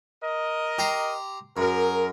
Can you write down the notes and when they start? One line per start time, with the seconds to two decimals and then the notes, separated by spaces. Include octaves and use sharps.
0.22 A#4 D#5
0.78 G4 A#5 C6
1.57 F#2 G#4 A#4